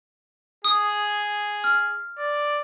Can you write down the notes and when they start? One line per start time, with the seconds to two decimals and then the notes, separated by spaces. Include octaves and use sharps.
0.64 G#4 D#6
1.64 F6
2.18 D5